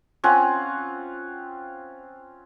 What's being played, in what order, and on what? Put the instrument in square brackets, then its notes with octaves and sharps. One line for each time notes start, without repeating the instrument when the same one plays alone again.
[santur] C4 C#4 F4 F#5